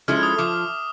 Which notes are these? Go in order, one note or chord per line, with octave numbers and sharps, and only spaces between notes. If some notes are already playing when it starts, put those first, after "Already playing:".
F3 G#3 C#4 E4 A4 F6
D#6
F3 D6